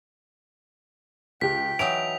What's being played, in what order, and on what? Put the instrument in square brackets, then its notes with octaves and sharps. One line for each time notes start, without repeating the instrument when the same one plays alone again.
[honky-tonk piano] C#2 G4 [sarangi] G5 [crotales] B6
[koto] E3 F#3 D#4 [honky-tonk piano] D7 [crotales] F7